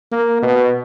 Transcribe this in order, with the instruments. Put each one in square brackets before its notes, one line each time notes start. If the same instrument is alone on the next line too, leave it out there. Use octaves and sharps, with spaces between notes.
[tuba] A#3
B2